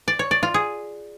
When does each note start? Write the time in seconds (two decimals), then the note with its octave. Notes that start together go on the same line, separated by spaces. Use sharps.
0.08 D5
0.19 C#5
0.31 D5
0.43 F4
0.54 G#4